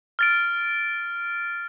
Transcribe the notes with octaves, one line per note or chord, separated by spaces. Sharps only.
F6 A6 D7